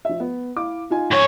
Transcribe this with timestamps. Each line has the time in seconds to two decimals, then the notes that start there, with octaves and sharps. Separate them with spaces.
0.05 F3 E5
0.20 B3
0.56 E4 F5 D6
0.90 D#4 F4 G#5
1.12 G#2 C#5